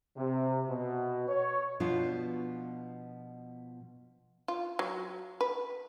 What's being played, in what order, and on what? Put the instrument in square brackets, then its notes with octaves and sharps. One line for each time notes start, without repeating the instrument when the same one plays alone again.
[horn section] C3
B2
C#5
[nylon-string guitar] B2 F3 B3 D4 F4
[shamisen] F4
F#3
B4